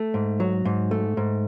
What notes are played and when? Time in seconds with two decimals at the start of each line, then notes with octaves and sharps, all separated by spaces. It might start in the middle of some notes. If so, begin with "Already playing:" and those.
Already playing: A3
0.14 G#2
0.40 F#3
0.65 G#2
0.91 A3
1.17 G#2